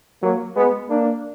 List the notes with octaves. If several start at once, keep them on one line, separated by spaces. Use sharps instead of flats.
F#3 A#3
G#3 B3
A#3 D4